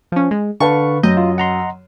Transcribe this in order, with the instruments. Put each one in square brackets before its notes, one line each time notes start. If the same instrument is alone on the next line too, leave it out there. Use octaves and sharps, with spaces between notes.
[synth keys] F3 C#4
G#3
[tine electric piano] D3 [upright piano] B4 F5 A5 [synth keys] C#6
[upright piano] F#2 [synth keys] D#5 [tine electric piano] G6
[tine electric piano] F4
F#5 A#5 C6